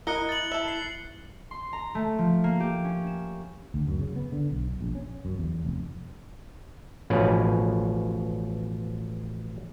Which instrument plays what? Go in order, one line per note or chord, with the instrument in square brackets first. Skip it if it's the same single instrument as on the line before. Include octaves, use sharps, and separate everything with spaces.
[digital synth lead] E4 [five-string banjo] A#4 D#5 [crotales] F#6 C#7 G7
[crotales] A6 F#7
[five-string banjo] A4 E5
[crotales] C7
[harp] C6
A#5
A3
F3
A#3
G4
C#4
E7
[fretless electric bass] D2
F#2
C#3
B3
D3
B1
A#1
C#4
F#2
E2
F1
[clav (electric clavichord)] A1 B2 F3 C#4 B4